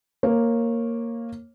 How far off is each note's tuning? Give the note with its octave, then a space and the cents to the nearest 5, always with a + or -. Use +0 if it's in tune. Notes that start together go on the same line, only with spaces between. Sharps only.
A#3 -5 C#5 -20